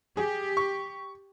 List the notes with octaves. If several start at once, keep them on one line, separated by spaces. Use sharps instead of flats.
G4 G#4
C#6